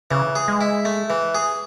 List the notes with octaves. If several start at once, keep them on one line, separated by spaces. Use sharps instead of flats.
C#3 E3
G#4
G#3
E4
A3
E3
G#4